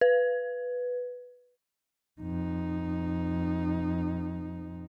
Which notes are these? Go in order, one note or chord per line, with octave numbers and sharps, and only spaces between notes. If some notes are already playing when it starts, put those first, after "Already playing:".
B4
F2 D#4